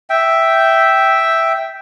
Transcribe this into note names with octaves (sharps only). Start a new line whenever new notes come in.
E5 G5